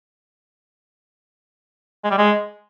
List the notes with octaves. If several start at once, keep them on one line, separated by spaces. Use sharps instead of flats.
G#3
G3
G#3